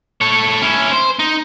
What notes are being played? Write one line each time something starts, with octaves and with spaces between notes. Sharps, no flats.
A4 C#5
C#4 E4
C5
D#4